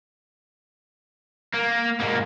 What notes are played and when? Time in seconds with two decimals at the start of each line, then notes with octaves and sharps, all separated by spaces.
1.54 A#3
2.01 G#2 A#3